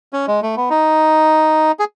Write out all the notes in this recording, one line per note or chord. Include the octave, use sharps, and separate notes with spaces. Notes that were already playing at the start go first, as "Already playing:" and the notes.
C#4
G#3
A3
B3
D#4
G#4